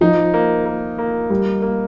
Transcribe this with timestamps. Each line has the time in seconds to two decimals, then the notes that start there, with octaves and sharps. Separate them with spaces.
0.01 F3 D#4
0.34 A#3
0.66 A#3
0.98 A#3
1.30 G3 A#3
1.62 A#3